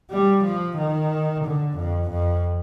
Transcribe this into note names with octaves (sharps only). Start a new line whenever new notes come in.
G3
F3
D#3
D3
F2
F2